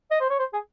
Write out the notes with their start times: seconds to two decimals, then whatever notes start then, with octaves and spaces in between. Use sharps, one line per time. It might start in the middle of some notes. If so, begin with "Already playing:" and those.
0.11 D#5
0.20 C5
0.30 C#5
0.39 C5
0.53 G#4